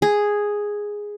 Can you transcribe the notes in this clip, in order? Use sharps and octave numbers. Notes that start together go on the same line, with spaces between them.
G#4